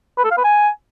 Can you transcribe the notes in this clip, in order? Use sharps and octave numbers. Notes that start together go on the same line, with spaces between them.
B4
A4
F5
B4
G#5